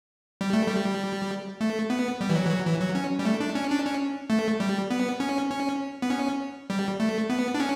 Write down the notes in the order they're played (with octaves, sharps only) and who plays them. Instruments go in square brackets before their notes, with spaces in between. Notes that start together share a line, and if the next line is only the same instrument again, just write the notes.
[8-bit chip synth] G3
A3
G3
A3
B3
G3
E3
F#3
E3
F#3
E3
F#3
C#4
G3
A3
D4
C#4
D4
C#4
A3
G3
B3
C#4
C#4
B3
C#4
G3
A3
B3
D4
C#4